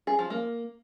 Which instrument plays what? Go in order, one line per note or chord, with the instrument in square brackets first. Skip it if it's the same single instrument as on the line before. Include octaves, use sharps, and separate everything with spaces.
[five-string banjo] G#4
F3
A#3